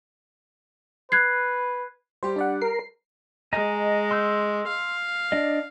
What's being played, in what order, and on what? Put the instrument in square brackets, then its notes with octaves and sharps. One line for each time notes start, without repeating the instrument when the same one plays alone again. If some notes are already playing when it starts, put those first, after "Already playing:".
[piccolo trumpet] B4 [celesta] F#6 G#6 C7
[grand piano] G3 G4 [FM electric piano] C5
[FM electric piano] D4 D5 F#5
[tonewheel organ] A#4 [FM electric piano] C7
[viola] G#3 [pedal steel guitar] D#5 G#5 A#5
[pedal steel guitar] C6 E6 G6
[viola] F5
[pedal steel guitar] D4 D5 D#5